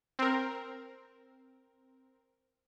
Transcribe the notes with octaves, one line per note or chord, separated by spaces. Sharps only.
C4 A#4